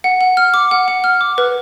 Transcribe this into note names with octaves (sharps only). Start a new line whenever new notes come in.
F#5
F#5
F6
D6
F#5
F#5
F6
D6
B4